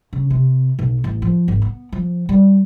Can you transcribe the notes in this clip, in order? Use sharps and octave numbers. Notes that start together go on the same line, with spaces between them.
C#3
C3
B1
A1
F3
G#1
B3
F3
G3